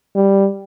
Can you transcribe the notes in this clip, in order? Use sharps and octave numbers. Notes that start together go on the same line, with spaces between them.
G3